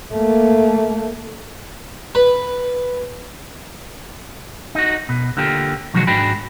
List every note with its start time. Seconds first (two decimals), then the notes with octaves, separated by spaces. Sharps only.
0.13 A3 A#3
2.15 B4
4.75 D#4 F#4
5.09 B2
5.37 D3 A#3 F4 G4
5.94 B2 D#3 F3 F#3 G#3 F#4
6.07 G#2 D4 F#4 G5 B5